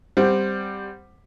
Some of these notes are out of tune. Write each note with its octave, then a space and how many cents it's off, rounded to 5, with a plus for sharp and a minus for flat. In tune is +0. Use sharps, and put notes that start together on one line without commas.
G3 +5 C4 -5 F#5 +0